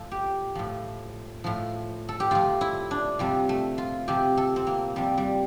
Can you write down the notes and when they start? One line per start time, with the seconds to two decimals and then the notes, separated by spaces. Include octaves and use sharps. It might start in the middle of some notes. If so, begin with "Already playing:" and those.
Already playing: A2 F3 A4
0.11 G4
0.55 A2 F3
1.44 A2 F3
2.09 A4
2.20 G4
2.31 A2 F3 F4
2.61 E4
2.91 D4
3.19 C3 F3 G3
3.49 A3
3.78 F4
4.08 C3 F3 G4
4.37 A4
4.56 C4
4.67 A#3
4.96 C3 F3 G3
5.18 G3